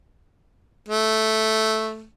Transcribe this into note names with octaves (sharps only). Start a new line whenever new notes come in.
A3